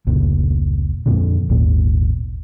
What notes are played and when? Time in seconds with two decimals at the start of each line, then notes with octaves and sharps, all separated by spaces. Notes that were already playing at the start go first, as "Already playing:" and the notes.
0.07 F1 C#2 A#2
1.06 F2 A#2 D3
1.49 G#1 D#2 A#2